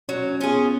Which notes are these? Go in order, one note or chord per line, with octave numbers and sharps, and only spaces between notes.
F#3 C#4
C#4
B3 C#4 F4 G#4
B3